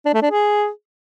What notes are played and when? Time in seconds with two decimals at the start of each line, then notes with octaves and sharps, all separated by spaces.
0.05 D4
0.14 A3
0.22 D4
0.31 G#4